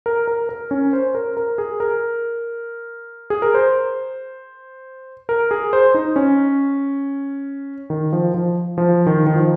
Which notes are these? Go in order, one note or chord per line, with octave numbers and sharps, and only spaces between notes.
A#4
A#4
A#4
C#4
C5
A#4
A#4
G#4
A#4
G#4
A#4
C5
A#4
G#4
C5
D#4
C#4
D#3
F3
F3
F3
D#3
D#3
F3